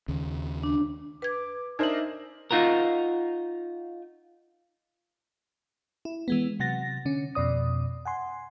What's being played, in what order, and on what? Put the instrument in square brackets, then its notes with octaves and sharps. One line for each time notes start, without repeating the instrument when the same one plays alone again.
[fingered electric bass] D#2 C#3
[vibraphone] D4
[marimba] B4 G#6 [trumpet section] D6
[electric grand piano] D4 A#4 C5 [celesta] D#4 F#7 [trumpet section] D#5 E5
[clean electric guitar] D#4 F4 F#4 A#4
[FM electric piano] E4
E3 G#3 B3
C3 F#3 F#5 A6 A#6
D3 C#4
F2 B2 D5 D#6
F#5 G#5 C6